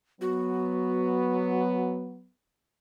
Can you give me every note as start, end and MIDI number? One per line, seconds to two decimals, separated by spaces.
0.21 2.28 54
0.21 2.28 59
0.21 1.76 66